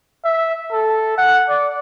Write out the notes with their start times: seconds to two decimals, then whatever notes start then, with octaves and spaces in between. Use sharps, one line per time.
0.24 E5
0.72 A4
1.18 F#5
1.49 D5